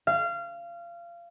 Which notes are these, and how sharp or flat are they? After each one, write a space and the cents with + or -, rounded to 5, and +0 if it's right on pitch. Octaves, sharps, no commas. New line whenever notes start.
F5 -25